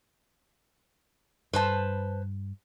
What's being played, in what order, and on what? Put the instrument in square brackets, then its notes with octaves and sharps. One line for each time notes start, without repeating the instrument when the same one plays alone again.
[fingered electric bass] G2 [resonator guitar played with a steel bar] B4 C5 A5